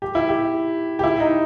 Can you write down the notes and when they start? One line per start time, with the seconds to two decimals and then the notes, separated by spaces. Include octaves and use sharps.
0.02 G4
0.15 E4
0.29 G4
0.99 G4
1.03 E4
1.20 D#4